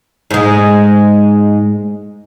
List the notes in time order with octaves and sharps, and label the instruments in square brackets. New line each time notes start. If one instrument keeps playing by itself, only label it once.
[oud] G#2 G#3